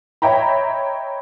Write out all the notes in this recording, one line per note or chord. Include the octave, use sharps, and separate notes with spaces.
C#5 D#5 E5 G5 A#5 B5